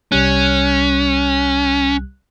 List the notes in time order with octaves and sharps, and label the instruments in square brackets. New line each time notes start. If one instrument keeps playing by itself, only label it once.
[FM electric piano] C2 G3 F#6 [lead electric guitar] C#4